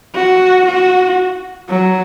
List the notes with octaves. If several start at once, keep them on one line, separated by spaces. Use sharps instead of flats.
F#4
F#4
F#3